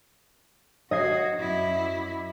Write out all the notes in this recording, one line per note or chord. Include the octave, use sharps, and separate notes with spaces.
F#4 D#5 G#6 C7
F#2 E4